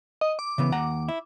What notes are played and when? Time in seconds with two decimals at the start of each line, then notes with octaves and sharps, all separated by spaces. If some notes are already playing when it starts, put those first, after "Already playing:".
0.21 D#5
0.39 D6
0.58 C#3 E3 B3
0.72 D#2 F#5 A#5
1.08 E4